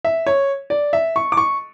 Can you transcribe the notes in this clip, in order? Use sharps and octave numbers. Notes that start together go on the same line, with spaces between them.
E5
C#5
D5
E5
C#6
D6
C#6